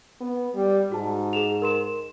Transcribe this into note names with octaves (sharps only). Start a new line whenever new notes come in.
B3
G3
G#2 F#4 A5
G#4 E7 F7
A#4 C6 E7